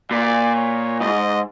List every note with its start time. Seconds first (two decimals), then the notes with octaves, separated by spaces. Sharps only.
0.11 A#2 D5
0.55 C#5
1.00 G#2 D#5